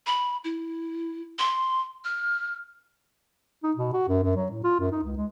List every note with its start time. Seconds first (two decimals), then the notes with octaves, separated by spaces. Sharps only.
0.06 B5
0.44 E4
1.39 C6
2.05 F6
3.63 D#4
3.76 B2
3.93 F#4
4.09 F#2
4.23 F#2
4.36 F#3
4.51 A2
4.64 F4
4.80 F#2
4.92 D#4
5.04 C#2
5.17 G#3